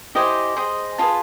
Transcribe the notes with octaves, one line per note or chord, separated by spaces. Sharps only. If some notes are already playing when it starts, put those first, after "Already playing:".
E4 G4 C5 D#5 G#5
G#4 C5 D#5
F4 G#4 B4 A5